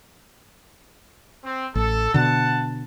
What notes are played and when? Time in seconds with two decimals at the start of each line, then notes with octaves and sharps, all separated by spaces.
1.44 C4
1.75 A1 A4
2.14 B2 D3 F#5 A5